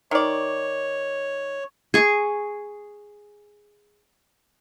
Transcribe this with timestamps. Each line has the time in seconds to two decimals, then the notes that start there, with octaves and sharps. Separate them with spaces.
0.11 D#3 C#5 D5
1.94 G#4 C#6